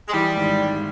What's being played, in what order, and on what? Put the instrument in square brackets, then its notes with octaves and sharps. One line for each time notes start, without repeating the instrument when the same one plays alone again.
[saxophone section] G#3
[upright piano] E3 [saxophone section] G3
[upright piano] G#1
G#1